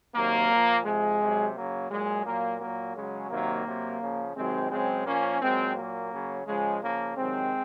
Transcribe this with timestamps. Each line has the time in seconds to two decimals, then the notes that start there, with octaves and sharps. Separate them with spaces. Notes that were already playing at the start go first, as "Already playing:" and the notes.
0.15 C3 D#3 F#3 A#3
0.50 A#2
0.55 F3
0.85 C3 F3 G#3
1.21 C3 F#3
1.56 C#3 F#3 A#3
1.91 A#2 F#3 G#3
2.26 A#2 F#3 A#3
2.61 A#2 F#3 A#3
2.96 C#3 F#3 G#3
3.30 C3 D#3 F#3 A#3
3.67 C3 F#3
4.01 C#3 F3
4.36 C3 D#3 F#3 G#3 C4
4.71 C#3 F#3 G#3 C4
5.06 A#2 F3 A#3 C#4
5.41 A#2 F#3 G#3 C4
5.76 A#2 F#3 A#3
6.12 C#3 F#3
6.47 C#3 F3 G#3
6.82 C#3 F3 A#3
7.17 C3 D#3 F#3 G#3 C4